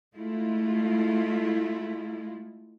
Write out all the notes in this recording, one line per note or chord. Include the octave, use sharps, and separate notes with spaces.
G#3 A3 E4 F4